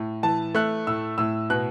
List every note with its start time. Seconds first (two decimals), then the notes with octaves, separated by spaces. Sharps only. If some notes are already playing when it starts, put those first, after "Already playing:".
Already playing: A2
0.23 E3 A5
0.54 A3 F#6
0.87 A2 E6
1.18 A2 E6
1.50 B2 F#6